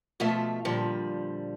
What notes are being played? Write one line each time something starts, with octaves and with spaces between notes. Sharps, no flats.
B2 F3 A3 F4 A4 E5
A#2 D3 F3 G3